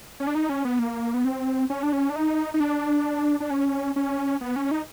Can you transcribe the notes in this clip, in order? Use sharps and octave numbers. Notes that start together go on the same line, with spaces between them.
C#4
D4
D#4
C#4
B3
A#3
B3
C4
C#4
D4
C#4
D4
D#4
D#4
D4
D4
C#4
C#4
B3
C#4
D#4